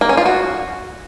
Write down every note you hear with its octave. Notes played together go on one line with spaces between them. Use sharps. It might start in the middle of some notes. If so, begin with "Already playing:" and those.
A#3
C#4
F4
F#4